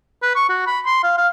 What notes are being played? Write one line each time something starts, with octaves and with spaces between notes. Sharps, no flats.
B4
C#6
F#4
B5
C6
F5
F5